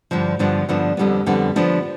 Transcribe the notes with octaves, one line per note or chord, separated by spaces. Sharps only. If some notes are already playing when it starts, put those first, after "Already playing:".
G2 D3 F3
G2 D3 F3 B3 D4
G2 D3 F3 B3 D4
F2 D3 G3 B3
F2 D3 G3 B3
D3 F3 B3 D4